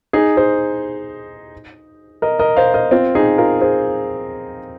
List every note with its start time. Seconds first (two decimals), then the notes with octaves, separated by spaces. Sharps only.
0.13 D#4 G#4
0.37 G#4 C5
2.22 A#4 D#5
2.39 A#4 D#5
2.57 C5 F5
2.74 A#4 D#5
2.91 C4 F4
3.15 D#4 G#4
3.38 F4 A#4
3.61 G#4 C5